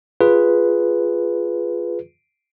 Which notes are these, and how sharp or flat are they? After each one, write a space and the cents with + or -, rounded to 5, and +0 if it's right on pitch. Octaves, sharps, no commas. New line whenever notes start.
F4 +0 G#4 +0 B4 +0